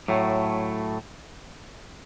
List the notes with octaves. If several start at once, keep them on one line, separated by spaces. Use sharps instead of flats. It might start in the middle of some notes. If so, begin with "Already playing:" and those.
A2 F#3 A3